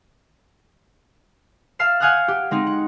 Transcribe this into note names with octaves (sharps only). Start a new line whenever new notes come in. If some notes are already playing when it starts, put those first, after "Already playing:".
E5 F5 A5 F6 C7 E7
F5 F#5 G#5 D#6 F6 F#6
G4
G#3 C4 D#4
F#5